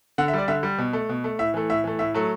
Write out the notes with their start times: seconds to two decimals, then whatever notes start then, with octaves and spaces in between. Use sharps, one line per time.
0.18 D3 F#5
0.28 E5
0.33 G3 D5
0.48 D3 E5
0.63 G3
0.78 B2
0.93 A3
1.09 B2
1.24 A3
1.39 A2 E5
1.54 E3 A3
1.70 A2 E5
1.84 E3 A3
1.99 A2 E5
2.14 F#3 A3